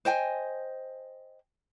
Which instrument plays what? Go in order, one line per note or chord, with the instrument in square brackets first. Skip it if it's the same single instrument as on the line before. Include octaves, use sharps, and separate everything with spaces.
[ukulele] C5 D#5 G5 G#5